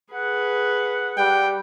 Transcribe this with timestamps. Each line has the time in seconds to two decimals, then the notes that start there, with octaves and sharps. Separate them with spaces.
0.13 G#4 B4 F#5
1.17 G3 G5